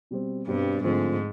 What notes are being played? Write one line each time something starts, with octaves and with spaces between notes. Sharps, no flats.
B2 G3 C4
G2 B2 G3 C4
G#2 D3 F3 A3 C4